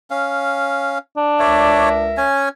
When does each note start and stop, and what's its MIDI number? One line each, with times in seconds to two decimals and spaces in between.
0.10 0.98 61
0.10 0.98 77
1.17 2.09 62
1.40 2.28 37
1.40 2.28 70
1.40 1.89 73
1.40 1.89 74
1.40 2.28 76
2.17 2.49 61
2.17 2.49 80